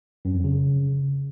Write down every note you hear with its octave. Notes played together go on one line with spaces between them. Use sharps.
F#2
F2
C#3